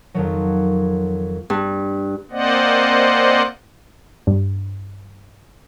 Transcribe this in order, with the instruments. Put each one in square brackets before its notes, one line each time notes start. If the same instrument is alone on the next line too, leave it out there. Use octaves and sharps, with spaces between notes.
[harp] F2 D#3 F#3
G2
[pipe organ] A#3 C4 C5 D5 D#5 F#5
[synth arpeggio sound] G2